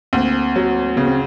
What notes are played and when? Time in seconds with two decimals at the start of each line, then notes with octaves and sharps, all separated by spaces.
0.13 D2 A#3 C4
0.56 F#3
0.96 C#3 B3
1.08 C4